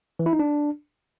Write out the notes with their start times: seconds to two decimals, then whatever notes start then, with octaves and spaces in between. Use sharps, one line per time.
0.19 E3
0.26 E4
0.33 D#4
0.39 D4